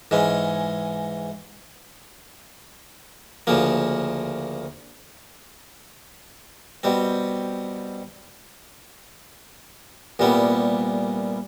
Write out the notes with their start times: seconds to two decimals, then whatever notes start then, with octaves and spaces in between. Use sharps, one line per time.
0.11 G#2 E3 G#3 C#4
3.47 D2 C#3 F3 A#3
6.83 B2 G3 C4
10.19 C2 A#2 G3 B3